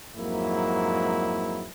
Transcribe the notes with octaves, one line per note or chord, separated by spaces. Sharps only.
F2 G#2 F#3 A#3 E4